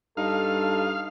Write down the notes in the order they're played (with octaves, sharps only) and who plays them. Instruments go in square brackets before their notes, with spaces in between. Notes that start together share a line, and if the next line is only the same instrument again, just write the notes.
[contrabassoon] G2 [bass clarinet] D#4 [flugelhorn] A4 [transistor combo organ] F5